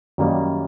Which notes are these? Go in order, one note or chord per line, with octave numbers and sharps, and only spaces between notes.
F#2 D#3 G3 A#3 D#4